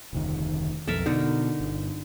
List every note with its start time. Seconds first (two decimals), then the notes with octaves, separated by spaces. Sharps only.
0.13 F1 D2 D#3
0.87 B1 F2 A4 A#4 E5
1.06 B2 D3 D#4 A#4
1.60 G1